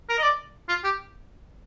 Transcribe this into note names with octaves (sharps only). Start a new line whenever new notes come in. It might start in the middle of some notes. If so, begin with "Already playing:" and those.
A#4
D#5
D5
F4
G4